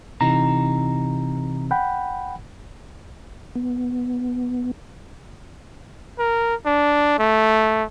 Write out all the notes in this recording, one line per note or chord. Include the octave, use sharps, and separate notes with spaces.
C3 E3 D#4 A#5
F#5 G5 B5
B3
A#4
D4
A3